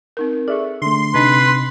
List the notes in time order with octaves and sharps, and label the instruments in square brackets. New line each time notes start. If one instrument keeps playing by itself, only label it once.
[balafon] C4 D#4 A#4
[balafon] G#4 A4 [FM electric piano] D5 E5 C#6
[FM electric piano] D3 A3 [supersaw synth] C6
[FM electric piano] C3 D#4 [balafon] C4 D4 [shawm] B4